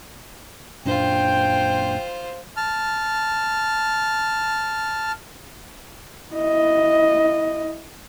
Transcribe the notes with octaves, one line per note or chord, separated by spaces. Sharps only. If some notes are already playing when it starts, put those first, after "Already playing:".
F#2 A#2 D4 F4 C5 G5
A5 F6
E4 D#5